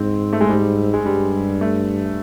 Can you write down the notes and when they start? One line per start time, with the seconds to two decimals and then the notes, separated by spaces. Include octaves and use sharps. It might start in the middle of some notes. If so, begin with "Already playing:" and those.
Already playing: G#2 C4
0.33 A3
0.41 G#3
0.49 G#2 G3
0.94 G#3
1.05 G2 G3
1.61 A3